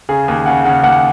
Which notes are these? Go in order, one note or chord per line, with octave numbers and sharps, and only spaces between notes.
C#3 G#4
D#2
C#3 F#5
C#3 F#5
D#2 F#5